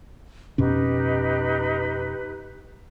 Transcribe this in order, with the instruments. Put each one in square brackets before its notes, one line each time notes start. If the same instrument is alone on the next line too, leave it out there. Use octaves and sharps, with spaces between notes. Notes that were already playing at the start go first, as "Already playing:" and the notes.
[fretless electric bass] F2 B2 C#4 [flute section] D#4 G4 B4